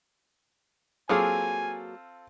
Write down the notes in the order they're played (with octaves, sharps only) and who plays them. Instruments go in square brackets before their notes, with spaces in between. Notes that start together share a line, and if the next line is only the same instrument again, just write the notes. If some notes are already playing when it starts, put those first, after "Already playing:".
[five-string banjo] F#3 A#3 G#4 [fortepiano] C4 F4 A4 [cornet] G#5